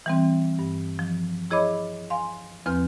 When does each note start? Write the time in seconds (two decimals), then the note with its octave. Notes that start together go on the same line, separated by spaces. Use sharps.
0.06 E3 G3 C4
0.59 G2
0.99 F3
1.51 E4 G#4 C#5 D#5 B5 D6
2.10 F5 G#5 C6
2.66 E2 F3 C4 B4 F6